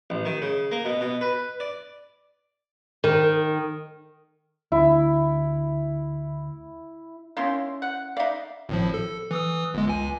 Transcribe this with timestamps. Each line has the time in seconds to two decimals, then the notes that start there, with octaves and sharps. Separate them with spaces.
0.10 A1
0.25 D#3
0.42 C#3
0.72 A#3
0.85 B2
1.01 B2
1.21 B4
1.60 D5
3.04 D#3
4.72 D2 E4
7.37 D#3 C#4 E4 F5 C6
7.82 F#5
8.17 D#4 D5 E5 F5
8.69 G#1 A2 F3
8.94 A4
9.31 E3 D#6 E6
9.74 G1 G#3
9.87 C#2 G#5